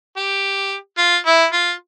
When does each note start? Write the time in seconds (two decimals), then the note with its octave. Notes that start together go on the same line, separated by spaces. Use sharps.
0.17 G4
0.98 F4
1.26 E4
1.53 F4